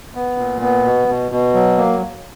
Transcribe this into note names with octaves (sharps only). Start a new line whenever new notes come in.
B3
A#2
B3
B2
B2
B2
F#3
A#3